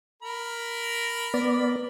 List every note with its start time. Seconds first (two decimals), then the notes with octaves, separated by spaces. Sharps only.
0.22 A#4 B5
1.34 B3 D5